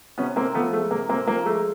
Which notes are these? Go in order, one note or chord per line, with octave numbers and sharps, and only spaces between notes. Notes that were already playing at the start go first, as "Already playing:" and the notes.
C3 B3 C#4
C3 A#3 C4
F3 A3 B3
G#3 A3
C3 A#3
C3 A#3 C4
F3 A#3
G#3 A3